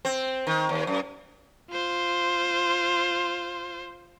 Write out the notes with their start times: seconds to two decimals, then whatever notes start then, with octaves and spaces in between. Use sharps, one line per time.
0.05 C4
0.47 D#3
0.69 D#2
0.87 F#2
1.71 F4 C5